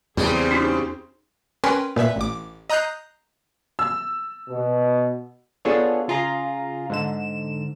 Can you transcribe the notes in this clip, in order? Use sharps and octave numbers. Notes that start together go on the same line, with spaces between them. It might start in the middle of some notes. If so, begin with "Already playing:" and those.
E2 C#3 G3 C4 G#4 C5
C#4 D#4 F#4
C#4 A#4 B4 G5 G#5 C6
A#2 B4 E5 B6
A1 D6
D#5 A#5 D#6 F#6 G6 C7
E6
B2
B3 D4 F4 G#4 A4 C#5
C#3 F4 G#4 A#5
G#2 D3 E7